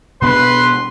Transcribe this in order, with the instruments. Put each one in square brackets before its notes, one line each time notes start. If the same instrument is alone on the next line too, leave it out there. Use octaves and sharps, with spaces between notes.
[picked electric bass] B2 B3 D4 [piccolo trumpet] B4 [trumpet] C6